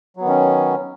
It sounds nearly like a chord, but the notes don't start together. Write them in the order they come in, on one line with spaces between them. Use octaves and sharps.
F#3 B3 D#3 C#4